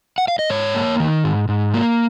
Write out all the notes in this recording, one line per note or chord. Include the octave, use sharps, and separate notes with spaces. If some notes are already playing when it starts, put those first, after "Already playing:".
F#5
F5
D#5
G#2 C#5
A#3
D#3
G#2
G#2
A#3